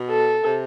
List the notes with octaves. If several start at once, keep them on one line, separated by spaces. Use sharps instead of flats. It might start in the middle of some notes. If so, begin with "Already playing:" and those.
Already playing: B2
A4
C3